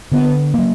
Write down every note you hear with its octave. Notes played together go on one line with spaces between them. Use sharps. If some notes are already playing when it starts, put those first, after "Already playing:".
D3 B3
F#3 A#3